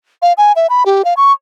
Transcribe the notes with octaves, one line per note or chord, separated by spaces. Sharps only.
F5
G#5
E5
B5
G4
F5
C#6